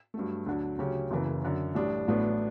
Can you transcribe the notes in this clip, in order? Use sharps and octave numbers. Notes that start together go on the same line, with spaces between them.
G2 F#3 A3
D2 D3 F#3
D2 C#3 F#3 C#4 G4
F#1 F#2 C#3 E3
F#2 D3 F#3
A1 A2 G3 D4
A1 A2 F#3 B3 D4